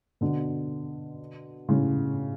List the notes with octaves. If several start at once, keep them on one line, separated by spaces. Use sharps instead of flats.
B2 D3
A2 C#3